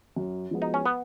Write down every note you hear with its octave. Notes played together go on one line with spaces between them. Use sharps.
F#2
F3 G#3 B3 F#4
D#4
C#4
B3